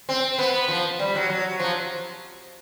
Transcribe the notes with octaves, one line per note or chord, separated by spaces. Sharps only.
C4
B3
F3
G3
F#3
F#3
F3